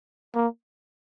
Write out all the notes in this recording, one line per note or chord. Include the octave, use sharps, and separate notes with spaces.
A#3